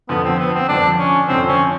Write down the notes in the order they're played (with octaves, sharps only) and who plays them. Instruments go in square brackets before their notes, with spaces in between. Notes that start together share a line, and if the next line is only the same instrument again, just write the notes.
[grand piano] F2 D3 F3 [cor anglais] B3
[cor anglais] C4
B3
C4
[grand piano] F2 D3 F3 [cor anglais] D4
[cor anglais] C#4
[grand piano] F2 D3 F3 [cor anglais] C4
[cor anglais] C#4